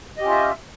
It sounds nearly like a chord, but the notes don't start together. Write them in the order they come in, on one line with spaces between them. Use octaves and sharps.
D#5 G4 C#4 F4 E5